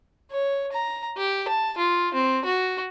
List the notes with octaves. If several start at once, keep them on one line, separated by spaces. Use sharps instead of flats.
C#5
A#5
G4
A5
F4
C4
F#4